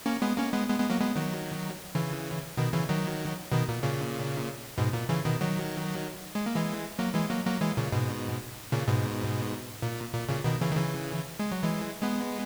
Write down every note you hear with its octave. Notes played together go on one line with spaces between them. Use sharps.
A#3 C#4
G#3 B3
A#3 C#4
G#3 B3
G#3 B3
G#3 B3
F#3 A#3
G#3 B3
D#3 F#3
C#3 E3
B2 D#3
C#3 E3
D#3 F#3
B2 D#3
A#2
A#2 C#3
G#2 B2
A#2
C#3 E3
B2 D#3
D#3 F#3
G#3
A#3
E3 G#3
F#3 A#3
E3 G#3
F#3 A#3
F#3 A#3
E3 G#3
A#2 C#3
G#2 B2
A#2 C#3
G#2 B2
A#2
A#2
A#2 C#3
B2 D#3
C#3 E3
D#3
C#3 E3
G#3
F#3
E3 G#3
G#3 B3